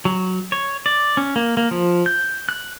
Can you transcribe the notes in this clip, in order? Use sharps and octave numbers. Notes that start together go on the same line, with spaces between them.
F#3
C#5
D5
C#4
A#3
A#3
F3
G6
F#6